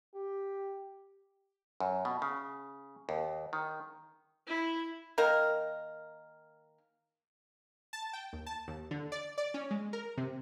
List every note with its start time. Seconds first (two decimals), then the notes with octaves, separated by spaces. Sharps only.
0.15 G4
1.80 F#2
2.05 B2
2.22 C#3
3.09 D#2
3.53 D#3
4.47 E4
5.18 D#3 A#3 A#4
7.93 A5
8.13 G5
8.33 D#2
8.46 A5
8.68 D#2
8.91 D3
9.12 D5
9.38 D5
9.54 C#4
9.71 G#3
9.93 A#4
10.17 C3